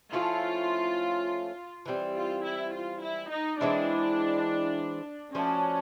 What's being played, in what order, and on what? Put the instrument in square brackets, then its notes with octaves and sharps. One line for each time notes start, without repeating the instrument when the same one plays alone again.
[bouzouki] F3 A3 C#4 E4 [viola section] F4
[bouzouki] E3 G3 C4
[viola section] F4
E4
F4
E4
D#4
[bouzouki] E3 G#3 C4 E4 [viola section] D4
[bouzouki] F3 A3 D4 F#4 [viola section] C#4